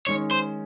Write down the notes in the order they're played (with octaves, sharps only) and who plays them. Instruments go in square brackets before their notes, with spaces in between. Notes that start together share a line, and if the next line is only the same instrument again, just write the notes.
[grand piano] D#3 G#3 C#4 [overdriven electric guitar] C#5
[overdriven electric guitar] C5